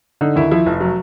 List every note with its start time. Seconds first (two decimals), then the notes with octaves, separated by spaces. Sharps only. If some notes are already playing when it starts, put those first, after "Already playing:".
0.21 D3 D#4
0.36 D#2 E4
0.51 F3 E4
0.66 F1
0.80 F#3